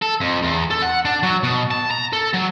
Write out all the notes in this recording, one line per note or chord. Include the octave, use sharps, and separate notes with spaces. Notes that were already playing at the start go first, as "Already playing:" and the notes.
A4
F2
E2
A4
F#5
D4
F#3
B2
A5
A#5
A4
F#3